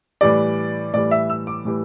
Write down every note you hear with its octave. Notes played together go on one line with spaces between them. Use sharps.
A2 E3 G3 D5
A2 E3 G3 D5
E5
E6
D6
A2 E3 G3